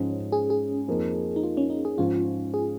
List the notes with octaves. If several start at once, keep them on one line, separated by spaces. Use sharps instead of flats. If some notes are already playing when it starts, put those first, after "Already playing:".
Already playing: G#2 F3 G#3 C#4
G#4
G#4
F2 F3 A#3 D#4
D#4
F4
C#4
D#4
G#4
G#2 F3 C#4 F4
G#4